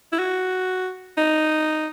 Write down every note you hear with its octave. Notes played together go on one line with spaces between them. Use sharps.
E4
F#4
D#4